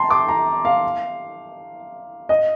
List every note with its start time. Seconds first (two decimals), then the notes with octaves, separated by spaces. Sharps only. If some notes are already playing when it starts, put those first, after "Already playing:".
Already playing: G5 A5 A#5 C6
0.10 D6
0.29 A#5
0.65 F5
2.29 D#5